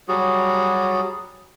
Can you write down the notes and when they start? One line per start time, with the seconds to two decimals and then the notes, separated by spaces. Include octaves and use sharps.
0.08 F#3 G3 F#4 G#4